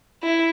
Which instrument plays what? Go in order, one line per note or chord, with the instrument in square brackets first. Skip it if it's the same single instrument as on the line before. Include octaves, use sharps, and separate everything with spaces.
[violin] E4